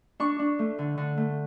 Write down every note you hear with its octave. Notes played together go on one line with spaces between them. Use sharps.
D4 C#6
D4
A3
D3
D3
A3